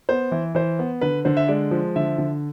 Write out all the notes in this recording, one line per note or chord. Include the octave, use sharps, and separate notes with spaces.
B3 C5
E3
E3 C5
B3
D3 B4
D3 C5
E5
G#3 D5
F3
D3 E5
D3